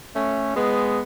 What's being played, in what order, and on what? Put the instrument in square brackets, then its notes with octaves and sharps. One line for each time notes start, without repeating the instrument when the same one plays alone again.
[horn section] A3 C#4
G#3 B3